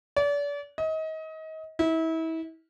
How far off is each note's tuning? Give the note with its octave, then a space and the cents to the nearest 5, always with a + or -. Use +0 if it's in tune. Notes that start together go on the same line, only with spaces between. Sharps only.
D5 -35
D#5 +30
E4 -30